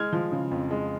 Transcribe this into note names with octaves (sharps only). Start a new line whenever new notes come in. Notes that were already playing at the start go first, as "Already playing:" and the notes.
Already playing: G#3 F6 G#6
F3
C#3
F2
G#3